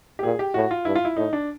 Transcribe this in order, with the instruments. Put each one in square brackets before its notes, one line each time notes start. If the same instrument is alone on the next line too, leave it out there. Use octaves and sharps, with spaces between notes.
[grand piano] G4
[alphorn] A#2 [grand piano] G#4
[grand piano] G4
[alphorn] A2 [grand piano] F#4
[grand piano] F4
[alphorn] G2 [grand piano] E4
[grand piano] F4
E4
[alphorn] A2 [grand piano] D#4
[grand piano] D4